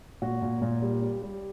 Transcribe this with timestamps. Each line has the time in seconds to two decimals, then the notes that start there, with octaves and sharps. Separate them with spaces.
0.22 A#2 F#4
0.42 A#2
0.62 A#2
0.82 G3
1.02 G3
1.22 G3